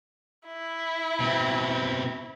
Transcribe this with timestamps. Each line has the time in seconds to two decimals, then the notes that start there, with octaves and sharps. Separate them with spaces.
0.47 E4
1.20 B2 C4